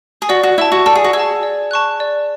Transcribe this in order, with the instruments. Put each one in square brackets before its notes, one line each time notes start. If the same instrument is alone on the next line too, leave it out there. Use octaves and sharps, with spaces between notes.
[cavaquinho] G#4
[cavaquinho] F#4 [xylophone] D5
[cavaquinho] F#4
[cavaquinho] E4 [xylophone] A5 E6
[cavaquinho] F#4
[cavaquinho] A4 [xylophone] D5
[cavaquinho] G#4
F#4
[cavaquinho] G#4 [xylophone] E6
[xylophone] A5
D5
A5 C#6 F#6
D5